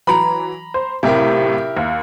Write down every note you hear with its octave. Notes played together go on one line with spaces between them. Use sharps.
E3 F#3 A#5 B5
C5
B1 A2 C3 E4 G4 A#4
D#2